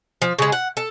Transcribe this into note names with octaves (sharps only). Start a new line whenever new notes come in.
F3
C#3 G#3
F#5
A4